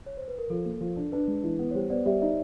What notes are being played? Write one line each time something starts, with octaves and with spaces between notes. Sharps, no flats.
C#5
C5
B4
A#4
F3 A4
A#3
F3
D4
D4 B4
G#3
E3
B3
C#5
G3 C5
B3 C5 D5
G3 D5 E5
D#4 D5 E5